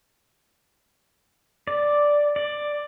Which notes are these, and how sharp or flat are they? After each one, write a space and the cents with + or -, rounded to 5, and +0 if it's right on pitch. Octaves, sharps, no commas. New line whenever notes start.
D5 +0
D5 +10